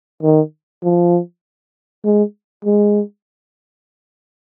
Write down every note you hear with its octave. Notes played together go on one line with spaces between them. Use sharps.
D#3
F3
G#3
G#3